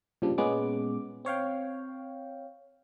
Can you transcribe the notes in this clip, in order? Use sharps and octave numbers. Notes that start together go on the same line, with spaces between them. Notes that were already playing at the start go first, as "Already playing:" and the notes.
G2 A#2 C#3 F3 G3 D4
A#2 G#3 B3 C#4 D6
C4 C#5 F5 G5